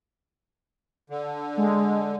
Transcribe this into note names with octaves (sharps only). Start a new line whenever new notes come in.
D3
G#3